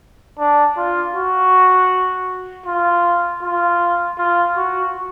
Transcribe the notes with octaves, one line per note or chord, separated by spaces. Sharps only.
D4
F4
F#4
F4
F4
F4
F#4